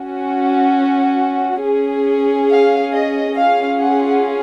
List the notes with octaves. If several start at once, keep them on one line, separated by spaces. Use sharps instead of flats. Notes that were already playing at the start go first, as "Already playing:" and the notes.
Already playing: C#4 F#4
C#4 G#4
F5
D#5
C#4 F4 G#4 F5
F#5